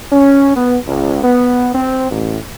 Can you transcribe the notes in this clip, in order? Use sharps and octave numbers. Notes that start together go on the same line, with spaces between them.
C#4
B3
C#2
B3
C4
A1